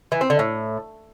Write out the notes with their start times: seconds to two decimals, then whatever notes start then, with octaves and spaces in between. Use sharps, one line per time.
0.12 E3
0.21 C4
0.30 D3
0.39 A2